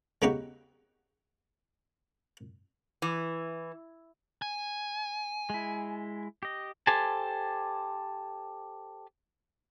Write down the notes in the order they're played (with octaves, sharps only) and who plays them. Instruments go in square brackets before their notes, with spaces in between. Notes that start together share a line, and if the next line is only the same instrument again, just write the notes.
[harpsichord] C#3 A3 B3 D#4 F#4 G4
[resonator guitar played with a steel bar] E3
[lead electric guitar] G#5
[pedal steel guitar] G#3 E4
G4 D#5
[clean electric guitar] G4 A4 C5 G#5 A5